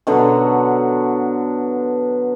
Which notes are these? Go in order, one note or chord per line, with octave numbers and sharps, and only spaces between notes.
B2 D3 F#3